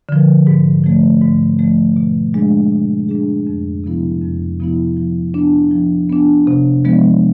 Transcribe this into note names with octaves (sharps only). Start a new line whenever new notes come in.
D3 F3
G#2
F3 A3
G#2
F3 A3
B2
G#3 D4 G#4
B2
G#3 D4 G#4
F2
C3 F3 B3 E4
F2
C3 F3 B3 E4
F3
B3 D4
F3
B3 D4
C3
F3 G#3 B3